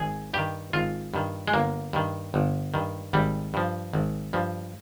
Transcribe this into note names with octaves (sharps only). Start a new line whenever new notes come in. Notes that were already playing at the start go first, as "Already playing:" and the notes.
Already playing: G#1 G#4
G2 D#3 G4
G#1 F4
G2 D#3
G#3
G1 A#3
G2 D#3
G1
G2 D#3
G#1 G3
G2 F3
G#1
G2 F3